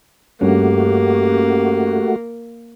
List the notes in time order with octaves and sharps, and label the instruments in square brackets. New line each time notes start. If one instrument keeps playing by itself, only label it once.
[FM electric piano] G2 C#4 [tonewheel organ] A3 F#4 [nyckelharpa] A#3 [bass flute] G4